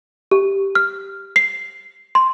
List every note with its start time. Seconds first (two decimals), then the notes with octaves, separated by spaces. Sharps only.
0.31 G4
0.75 F6
1.36 C7
2.15 C6